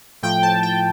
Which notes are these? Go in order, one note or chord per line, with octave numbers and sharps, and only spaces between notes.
A2 F3 G5
A5
G5